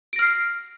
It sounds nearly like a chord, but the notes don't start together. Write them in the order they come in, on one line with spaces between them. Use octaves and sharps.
D7 A#6 F6 C7